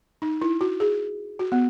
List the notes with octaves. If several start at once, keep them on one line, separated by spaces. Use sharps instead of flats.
D#4
E4
F#4
G#4
F#4
B3